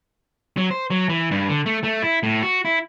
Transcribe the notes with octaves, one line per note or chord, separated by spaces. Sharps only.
F#3
C5
F#3
E3
G2
D3
A3
A3
E4
A2
F#4
E4